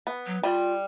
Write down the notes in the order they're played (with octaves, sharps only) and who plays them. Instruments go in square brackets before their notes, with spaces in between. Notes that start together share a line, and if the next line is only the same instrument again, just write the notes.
[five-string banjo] B3
[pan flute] F#3
[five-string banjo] G3 [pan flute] F4